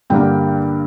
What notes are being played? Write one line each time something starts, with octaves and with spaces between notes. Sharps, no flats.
G2 D3 G3 A#3 G5